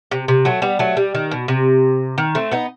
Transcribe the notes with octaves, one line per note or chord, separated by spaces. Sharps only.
C3
C3
F#3 A3
G3 B3
F#3 A3
G3
D#3
B2
C3
D#3
A3 C4
B3 D#4